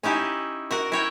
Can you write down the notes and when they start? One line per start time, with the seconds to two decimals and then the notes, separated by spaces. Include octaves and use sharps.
0.03 C#4 D#4 E4 G4
0.71 F#4 A#4 F#5
0.92 E4 C#5 G5